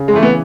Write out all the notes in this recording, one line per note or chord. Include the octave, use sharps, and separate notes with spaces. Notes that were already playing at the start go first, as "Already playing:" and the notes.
Already playing: C#3
G#3
E3 A3
B3